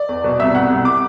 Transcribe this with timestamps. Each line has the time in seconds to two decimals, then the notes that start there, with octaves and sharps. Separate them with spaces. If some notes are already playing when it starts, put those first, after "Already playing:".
Already playing: D5
0.09 E2
0.24 B2
0.39 C2 E5
0.55 C2 F#5
0.70 C2
0.85 D6